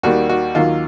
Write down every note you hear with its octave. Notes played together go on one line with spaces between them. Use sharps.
D#2 D#3 G3 A#3 F#4
F#4
D#2 D#3 F#3 A#3 F4